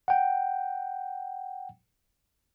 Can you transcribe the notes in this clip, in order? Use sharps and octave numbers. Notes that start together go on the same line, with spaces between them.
F#5 G5